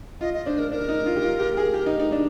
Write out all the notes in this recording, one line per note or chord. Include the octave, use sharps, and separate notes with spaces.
F4 D#5
D#5
D4 C5
A#4
D4 A#4
D#4
F4
G4
F4
G4
G#4
G4
D#4
D#4
D4